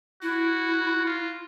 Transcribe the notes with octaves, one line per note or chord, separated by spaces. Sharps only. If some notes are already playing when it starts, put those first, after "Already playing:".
E4 F#4
F4